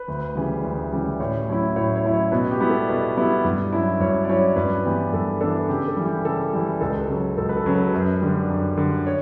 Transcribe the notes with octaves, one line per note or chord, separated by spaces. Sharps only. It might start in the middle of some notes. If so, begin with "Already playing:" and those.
Already playing: B4
D2
C#3 E3 G3
D2
C#3 E3 G3
A2 C#5
F#3 C#4 E4
A2 C#5
C#5
F#3 C#4 E4
C#5
B2 B4
G4
G3 B3 E4
A4
B2
G3 B3 E4
G2
F#3 C#4 E4
G2 C#5
D5
F#3 C#4 E4 C#5
G2 B4
E3 B3 D4 G4
G2 A4
E3 B3 D4 A4
C#3 G4
A4
E3 G3
G4
C#3 A4
E3 G3
C#2 A4
C#3 F#3
C#2 A4
B4
A4
C#3 F#3
B4
F#2
D3 G3
F#2
D3 G3
C#5